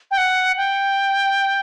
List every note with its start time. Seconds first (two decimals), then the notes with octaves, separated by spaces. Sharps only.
0.11 G5
0.18 F#5
0.57 G5